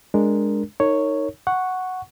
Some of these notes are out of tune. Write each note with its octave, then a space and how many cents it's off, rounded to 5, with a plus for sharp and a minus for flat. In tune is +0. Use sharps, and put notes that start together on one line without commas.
G#3 +0 D4 +0 A#4 +0
D#4 +0 A#4 -30 C#5 +0
F#5 +0 C#6 +0